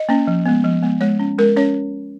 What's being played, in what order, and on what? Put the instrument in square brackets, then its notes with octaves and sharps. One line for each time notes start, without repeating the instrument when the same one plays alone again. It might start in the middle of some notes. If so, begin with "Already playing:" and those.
Already playing: [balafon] D#5
A#3 C#4
F3
G#3 B3
F3
G#3 B3
G#3 C#5
C#4
G#3 A#4
C#4 C#5